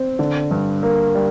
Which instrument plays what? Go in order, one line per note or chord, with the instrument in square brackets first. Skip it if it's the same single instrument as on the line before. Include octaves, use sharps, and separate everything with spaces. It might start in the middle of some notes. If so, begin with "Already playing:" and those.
Already playing: [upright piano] C4
[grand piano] D3
G2
A#3
G3